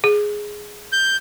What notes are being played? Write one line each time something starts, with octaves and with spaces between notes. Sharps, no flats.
G#4
G6